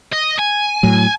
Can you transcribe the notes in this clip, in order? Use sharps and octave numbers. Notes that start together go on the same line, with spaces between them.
D#5
G#5
A2 F#3